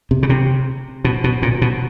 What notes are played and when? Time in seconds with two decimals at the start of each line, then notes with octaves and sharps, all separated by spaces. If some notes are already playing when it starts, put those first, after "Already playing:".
0.11 C3
0.23 C#3
0.29 C3
1.05 B2
1.24 B2
1.42 A#2
1.62 B2